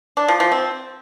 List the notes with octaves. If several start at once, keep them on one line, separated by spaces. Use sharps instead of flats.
D4
F3
F3
C4